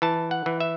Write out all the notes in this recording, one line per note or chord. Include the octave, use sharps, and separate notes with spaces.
E3 A5
F#5
E3
E5